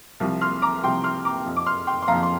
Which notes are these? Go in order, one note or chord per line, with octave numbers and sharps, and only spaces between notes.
C2 C3 F3
C6 F6
A#5 D6
C2 C3 F3 G5 C6
C6 F6
A#5 D6
F2 F3
D6
C6 F6
G5 C6
C6
F2 F3 F5 A#5
C6